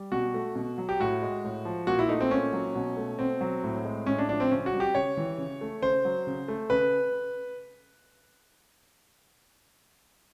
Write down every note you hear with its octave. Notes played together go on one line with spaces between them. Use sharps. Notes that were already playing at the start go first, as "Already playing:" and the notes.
Already playing: G3
B2 F#4
A3
B2
F#3
G4
A2 F#4
G#3
A2
F3
A#2 F#4
E4
A3 D#4
C4
A#2 C#4
F#3
B2
A3
B2 C4
F#3
A2
G#3
A2 C#4
D4
F3 D4
C4
C#3 C#4
F#4
G3
G4
C#3 C#5
E3
C#3
A3
C#3 C5
F#3
C#3
A3
C#3 B4